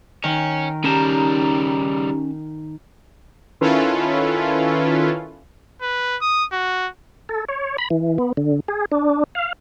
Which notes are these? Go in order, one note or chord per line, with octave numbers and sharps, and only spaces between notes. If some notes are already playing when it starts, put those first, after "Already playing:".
D#3 C#4
C#3 G3 C#4 D#4 G4 A#4 A5 A#5
D#3 C#4 E4 F4 A4 B4
B4
D#6
F#4
A4
C#5
B5
E3
B3
D3
G#4
D4
F5